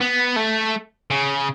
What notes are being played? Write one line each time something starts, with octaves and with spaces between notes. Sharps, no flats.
B3
A3
C#3